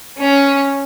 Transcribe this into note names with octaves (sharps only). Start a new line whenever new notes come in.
C#4